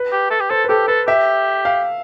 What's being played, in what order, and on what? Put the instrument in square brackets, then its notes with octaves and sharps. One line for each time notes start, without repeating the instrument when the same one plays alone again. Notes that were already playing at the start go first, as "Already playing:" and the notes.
Already playing: [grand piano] B4
[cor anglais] G4
A4
G4
[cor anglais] A4 [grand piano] C5
[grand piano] B4
[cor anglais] G4 [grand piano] A4
[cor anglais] A4 [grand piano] B4
[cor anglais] G4 [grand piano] E5
[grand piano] F5